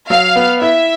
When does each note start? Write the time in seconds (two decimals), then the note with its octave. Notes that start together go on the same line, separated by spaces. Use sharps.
0.10 F#3 F5
0.36 B3
0.62 E4 E5